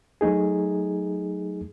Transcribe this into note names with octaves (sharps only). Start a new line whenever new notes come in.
F#3 A3 D#4 G#4